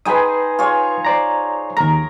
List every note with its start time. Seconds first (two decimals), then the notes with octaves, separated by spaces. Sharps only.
0.06 D#4 G#4 B4 C5 G5 D#6
0.59 F4 G#4 C#5
1.05 C5 D5 A#5
1.77 D#2 A#4 A#5